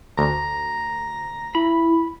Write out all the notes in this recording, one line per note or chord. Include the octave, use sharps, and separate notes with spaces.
D2 A#5
E4 B5